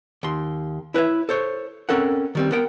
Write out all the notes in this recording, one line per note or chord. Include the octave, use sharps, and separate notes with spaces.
D#2 C6
E4 B4 C#5 E5
A4 C5 C#5
C4 C#4 A4 A#4 F#5
D#3 G3 C4
B3 A#4 F#5 G5